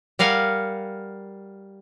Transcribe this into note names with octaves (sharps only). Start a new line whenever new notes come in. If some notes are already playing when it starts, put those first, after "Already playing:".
G3 A#4 F5 F#5 G#5